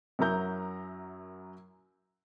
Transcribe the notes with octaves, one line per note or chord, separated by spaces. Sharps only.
F#2 F#3 E4 A#4 A#5 G6